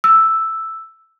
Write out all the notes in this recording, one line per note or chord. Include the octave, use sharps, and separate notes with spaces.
E6